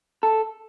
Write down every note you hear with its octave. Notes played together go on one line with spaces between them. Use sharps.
A4